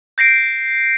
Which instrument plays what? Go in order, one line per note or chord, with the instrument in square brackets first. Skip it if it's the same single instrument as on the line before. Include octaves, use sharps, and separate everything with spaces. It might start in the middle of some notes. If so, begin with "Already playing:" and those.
[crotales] G6 A#6 C7 D7